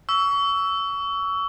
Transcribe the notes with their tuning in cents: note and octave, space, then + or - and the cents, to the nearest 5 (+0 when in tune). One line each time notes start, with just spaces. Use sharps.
C#6 +30 E6 -5